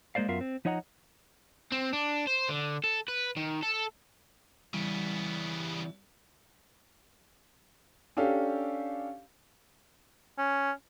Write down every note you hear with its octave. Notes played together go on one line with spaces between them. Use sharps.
G#3 A#3 C5 D5 F5
F#2 B3 F4 A#4 E5 F5
C4
F3 D#4 C#5 D#5 F#5 A#5
C4
D4
C5
D3
A4
B4
D#3
A4
C#3 E3 G3 B3
C#4 D4 G4 A4 F5
C#4